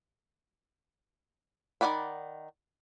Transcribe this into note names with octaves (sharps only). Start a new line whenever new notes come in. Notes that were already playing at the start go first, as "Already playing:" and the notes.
D#3 E3 D5 F#5 B5